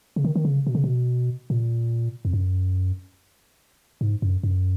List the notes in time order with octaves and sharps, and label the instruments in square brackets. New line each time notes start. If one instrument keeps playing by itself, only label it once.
[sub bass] C#3
D#3
D#3
C#3
B2
C#3
B2
A#2
F2
F#2
G#2
F#2
F#2